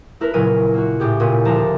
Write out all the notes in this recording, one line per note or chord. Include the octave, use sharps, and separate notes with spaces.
A3 E4 A#4 B4
A#2 C#3 F#3 E4 A#4 D#7
A#3 F4 F#4
A2 G4 G#4
A#2 C#3 D#7
D2 F3 E4 A5 A#5